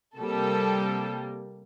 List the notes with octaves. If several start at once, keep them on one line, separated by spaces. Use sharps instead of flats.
C3 G3 A#3 A4